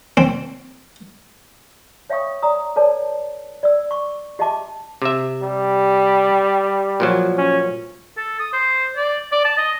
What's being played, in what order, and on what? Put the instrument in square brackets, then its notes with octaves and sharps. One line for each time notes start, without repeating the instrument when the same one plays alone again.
[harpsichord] C4
[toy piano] C#5 E5 F5 G5 C#6 D#6
D5 A#5 D#6
A4 B4 C#5 D5 A5
D5 E6
C#6 D6
G4 D#5 E5 G5 A5 D6
[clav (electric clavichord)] C3 E5
[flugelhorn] G3
[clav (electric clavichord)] A#2 F3 F#3
[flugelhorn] C#4
[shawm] A4
D#6
C5
D5
D5
A5
D#5